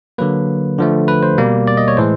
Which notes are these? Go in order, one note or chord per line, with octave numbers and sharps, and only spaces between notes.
D3 F#3 A#3 B4
D3 F3 A3
B4
C5
B2 G3 A#3
D5
D#5
C#5
A2 E3 G#3 C5